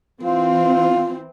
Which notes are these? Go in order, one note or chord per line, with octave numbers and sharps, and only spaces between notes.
E3 C4 F4